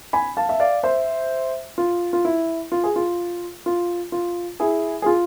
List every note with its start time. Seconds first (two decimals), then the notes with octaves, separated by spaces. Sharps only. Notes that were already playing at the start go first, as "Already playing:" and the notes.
0.13 G#5 B5
0.37 F5 A5
0.49 E5
0.60 D5 F5
0.83 C5 E5
1.78 F4
2.13 F4
2.25 E4
2.72 F4
2.84 G#4
2.96 F4
3.66 F4
4.12 F4
4.60 E4 G#4
5.02 G#4
5.06 F4